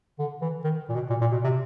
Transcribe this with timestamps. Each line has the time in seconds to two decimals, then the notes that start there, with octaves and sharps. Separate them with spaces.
0.19 D3
0.41 E3
0.64 D#3
0.89 A#2
0.95 B2
1.10 A#2
1.21 A#2
1.32 B2
1.44 C3